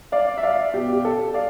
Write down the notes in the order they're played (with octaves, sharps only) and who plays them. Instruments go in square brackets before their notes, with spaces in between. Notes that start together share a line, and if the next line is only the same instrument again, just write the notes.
[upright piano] D5 F5
E5
D5 F5
B2 G4
G4
A4
D5 F5